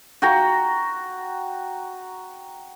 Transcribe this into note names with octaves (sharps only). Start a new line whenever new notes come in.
F#4 G5 A#5